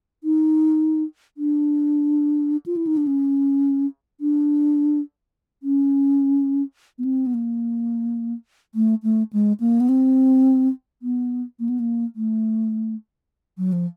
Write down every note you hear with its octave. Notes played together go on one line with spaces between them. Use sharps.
D#4
D4
F4
E4
D#4
D4
C#4
D4
C#4
B3
C4
B3
A#3
A3
A3
G#3
A#3
B3
C4
B3
A#3
B3
A#3
A3
F#3
F3